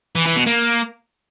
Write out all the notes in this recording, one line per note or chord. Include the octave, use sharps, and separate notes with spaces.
E3
E3
B2
A#3